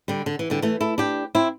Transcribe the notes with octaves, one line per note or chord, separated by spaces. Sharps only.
D3 G3
D3
E3
D3 G3
E3 A3
E4 A4
D4 G4
C4 E4